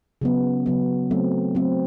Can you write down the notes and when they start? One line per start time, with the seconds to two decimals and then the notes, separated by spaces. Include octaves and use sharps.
0.21 C#3 F#3 B3
0.66 C#3 F#3 B3
1.11 F#3 A3 C4
1.55 F#3 A3 C4